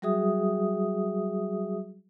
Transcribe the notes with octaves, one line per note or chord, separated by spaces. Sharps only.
F#3 G3 F#4 G#4 E5 D#6